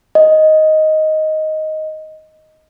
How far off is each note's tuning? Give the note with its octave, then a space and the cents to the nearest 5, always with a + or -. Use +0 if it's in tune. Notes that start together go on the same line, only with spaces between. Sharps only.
D#5 +5